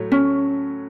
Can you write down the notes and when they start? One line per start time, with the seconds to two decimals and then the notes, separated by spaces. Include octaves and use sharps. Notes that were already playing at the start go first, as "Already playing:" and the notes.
Already playing: A2 F#3 A3
0.12 C#4